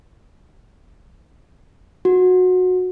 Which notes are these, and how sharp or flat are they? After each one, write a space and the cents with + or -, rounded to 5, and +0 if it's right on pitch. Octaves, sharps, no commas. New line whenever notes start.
F#4 -15